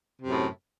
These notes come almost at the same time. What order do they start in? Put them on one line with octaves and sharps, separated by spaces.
C3 F#2 A2